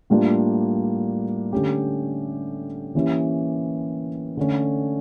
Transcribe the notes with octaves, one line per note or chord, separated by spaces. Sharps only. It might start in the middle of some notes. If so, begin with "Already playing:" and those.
A2 G3 A#3 D4 F4
D3 A3 C#4 G4
E3 A#3 C#4 E4 G4
D3 A3 C#4